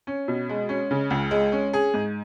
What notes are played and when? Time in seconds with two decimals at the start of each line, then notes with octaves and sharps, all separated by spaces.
0.07 C#4
0.28 B2
0.49 G#3
0.69 C#4
0.91 C#3
1.10 C#2
1.31 G#3
1.52 C#4
1.73 G#4
1.94 G#2